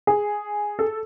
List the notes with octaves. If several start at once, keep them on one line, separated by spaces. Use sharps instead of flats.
G#4
A4